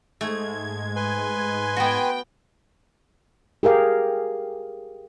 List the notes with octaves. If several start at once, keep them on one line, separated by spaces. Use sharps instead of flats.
G#2 G#3 A3 G#6
B4 G#5 C6
B3 F#4 G5
G4 G#4 A#4 F5